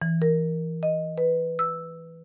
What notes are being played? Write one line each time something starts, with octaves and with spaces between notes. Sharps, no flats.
E3
A#4
D#5
B4
E6